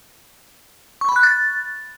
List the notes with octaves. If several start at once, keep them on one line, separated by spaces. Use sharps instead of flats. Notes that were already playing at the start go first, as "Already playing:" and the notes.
C#6
B5
F#6
A6